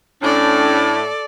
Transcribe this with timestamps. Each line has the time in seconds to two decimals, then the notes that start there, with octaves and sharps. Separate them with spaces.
0.22 A2 C#4 D4 A4 D5